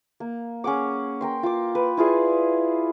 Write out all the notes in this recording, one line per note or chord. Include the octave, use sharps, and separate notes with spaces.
A#3
C#4 G#4 F#5 D6
A#4 G5 C6
F4 D6
B4
E4 F4 G#4 D5